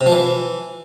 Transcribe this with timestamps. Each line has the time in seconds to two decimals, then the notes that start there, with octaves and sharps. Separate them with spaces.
0.01 C3
0.06 F3
0.12 E3